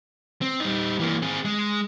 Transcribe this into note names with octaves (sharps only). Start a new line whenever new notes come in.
C4
G3 D#4
E3 A#3
C4 G#4
G#3